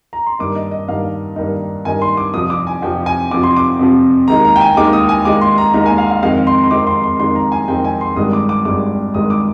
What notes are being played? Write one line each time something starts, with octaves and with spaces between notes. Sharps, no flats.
A#5
C6
G2 D#3 A#3 D#4 D6
D#5
D#5
G2 D#3 A#3 D#4 F5
G2 D#3 A#3 D#4
G2 D#3 A#3 D#4 G#5
C6
D6
F2 C3 F3 D#6
D6
G#5
F2 C3 F3 G5
G#5
F2 C3 F3 D6
C6
D6
F2 C3 F3
D#2 D#3 G#3 D#4 A#5
A#5
G5
G#5
D#2 D#3 G#3 D#4 D6
D#6
G#5
D#2 D#3 G#3 D#4 D6
C6
A#5
D#2 D#3 G#3 D#4 A#5
G#5
F5
F5
F2 D#3 G#3 C4 D#4 F5
C6
C6
F2 D#3 G#3 C4 D#4 D6
C6
C6
F2 D#3 G#3 C4 D#4 C6
A#5
G#5
F2 D#3 G#3 C4 D#4 G5
G#5
C6
G#1 G2 D#3 G#3 D#6
D6
D6
G#1 G2 D#3 G#3 D6
G#1 G2 D#3 G#3 D#6
D6